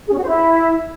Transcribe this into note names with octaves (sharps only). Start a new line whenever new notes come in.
G#4
C#4
F#4
C5
E4